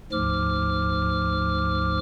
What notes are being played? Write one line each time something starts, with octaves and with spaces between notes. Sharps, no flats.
D2 G#2 F3 D6 F6